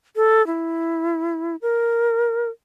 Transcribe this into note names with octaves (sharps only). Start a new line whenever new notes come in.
A4
E4
A#4